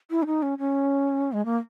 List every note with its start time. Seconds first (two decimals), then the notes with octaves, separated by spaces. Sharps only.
0.10 E4
0.22 C#4
0.26 D#4
0.42 C#4
0.59 C#4
1.33 G#3
1.45 A#3